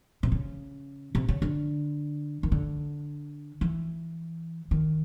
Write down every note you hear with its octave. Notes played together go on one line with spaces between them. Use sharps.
C3
C#3
C3
C#3
D3
D#3
D3
E3
D#3